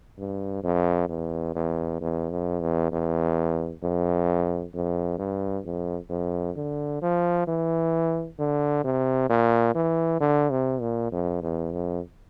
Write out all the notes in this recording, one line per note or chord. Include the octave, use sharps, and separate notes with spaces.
G2
F2
E2
E2
E2
F2
E2
E2
F2
F2
G2
F2
F2
D3
F3
E3
D3
C3
A#2
E3
D3
C3
A#2
F2
E2
F2